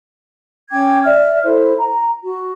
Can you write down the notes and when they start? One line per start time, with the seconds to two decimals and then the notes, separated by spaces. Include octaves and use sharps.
0.71 C#4 G5 D6 G#6
1.04 D5 E5 F6
1.44 E4 A4 C5
1.79 A#5
2.23 F#4